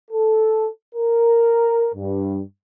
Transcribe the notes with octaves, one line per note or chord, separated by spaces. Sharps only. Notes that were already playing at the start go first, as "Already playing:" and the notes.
A4
A#4
G2